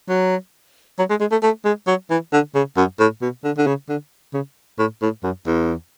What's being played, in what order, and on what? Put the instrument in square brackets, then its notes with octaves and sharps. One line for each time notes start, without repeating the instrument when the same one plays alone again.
[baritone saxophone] F#3
F#3
G#3
G#3
A3
A3
G#3
F#3
E3
D3
C#3
F#2
A2
B2
D3
D3
C#3
D3
C#3
A2
A2
F#2
E2